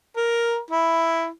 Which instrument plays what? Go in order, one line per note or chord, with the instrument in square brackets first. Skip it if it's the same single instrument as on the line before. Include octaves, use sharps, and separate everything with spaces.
[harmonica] A#4
E4